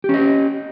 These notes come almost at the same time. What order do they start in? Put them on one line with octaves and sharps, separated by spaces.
G4 C#4 D#5